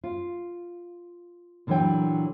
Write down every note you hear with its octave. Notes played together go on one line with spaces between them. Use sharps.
F4
A#2 D3 E3 F#3 C#5 G5